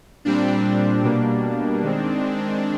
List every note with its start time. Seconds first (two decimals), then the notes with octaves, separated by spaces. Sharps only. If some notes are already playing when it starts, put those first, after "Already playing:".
0.25 A#2 G3 C4 D4
1.04 B2 G3 A#3 D4
1.82 D#3 G#3 C4